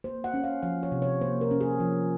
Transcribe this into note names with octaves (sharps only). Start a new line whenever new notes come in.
A#3 C5
F#5
C#4
F5
F3 F5
C#5
C3
C#5
A#3 C5
A#4
C#4
G#4
F3